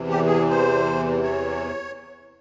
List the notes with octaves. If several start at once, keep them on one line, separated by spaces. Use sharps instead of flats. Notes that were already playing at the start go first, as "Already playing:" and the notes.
Already playing: E2 C3 E3
G4
G#4
C5
C#5